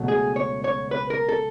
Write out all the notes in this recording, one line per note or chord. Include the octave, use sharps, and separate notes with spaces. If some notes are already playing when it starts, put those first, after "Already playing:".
Already playing: C#2 B2 F#3 A3
G#4
C#5
C#5
B4
A#4
A4